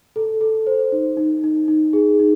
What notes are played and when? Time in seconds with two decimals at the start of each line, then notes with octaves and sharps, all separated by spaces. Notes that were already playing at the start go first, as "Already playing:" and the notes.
0.16 A4
0.41 A4
0.67 C5
0.92 D#4
1.17 D#4
1.44 D#4
1.68 D#4
1.93 G#4
2.20 D#4